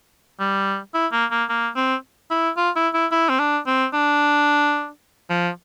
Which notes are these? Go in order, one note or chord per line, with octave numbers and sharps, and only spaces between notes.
G3
E4
A#3
A#3
A#3
C4
E4
F4
E4
E4
E4
C4
D4
C4
D4
F3